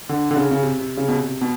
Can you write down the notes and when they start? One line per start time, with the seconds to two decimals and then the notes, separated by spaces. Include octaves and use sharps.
0.09 D3
0.31 D3
0.36 C#3
0.51 C#3
0.62 C3
0.80 C3
0.97 C#3
1.08 B2
1.15 C3
1.28 C3
1.41 B2